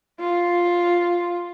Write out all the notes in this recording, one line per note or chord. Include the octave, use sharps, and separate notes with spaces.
F4